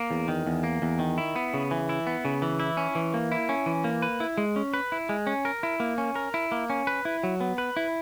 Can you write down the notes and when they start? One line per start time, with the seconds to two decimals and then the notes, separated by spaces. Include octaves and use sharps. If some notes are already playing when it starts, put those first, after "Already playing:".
Already playing: A#3
0.11 E2
0.28 D#3
0.46 E2
0.63 A#3
0.82 E2
0.99 D#3
1.18 E4
1.36 B3
1.54 C#3
1.71 E3
1.89 E4
2.07 B3
2.25 C#3
2.42 E3
2.60 E4
2.77 C#4
2.95 E3
3.14 A#3
3.32 E4
3.49 C#4
3.66 E3
3.84 A#3
4.02 B4
4.20 E4
4.38 G#3
4.56 C#4
4.74 B4
4.92 E4
5.09 G#3
5.27 C#4
5.45 A#4
5.63 E4
5.80 A#3
5.98 C#4
6.16 A#4
6.34 E4
6.52 A#3
6.70 C#4
6.87 B4
7.05 E4
7.23 F#3
7.41 B3
7.58 B4
7.77 E4